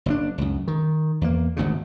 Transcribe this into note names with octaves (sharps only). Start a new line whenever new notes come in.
F#1 A2 D4
C#2 F#2
D#3
E2 A#3
G#1 D2 G2 C#3